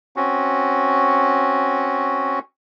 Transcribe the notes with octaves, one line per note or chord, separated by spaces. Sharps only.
C4 C#4 F#4